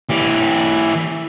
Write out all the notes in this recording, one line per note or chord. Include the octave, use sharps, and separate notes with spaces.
E3 G4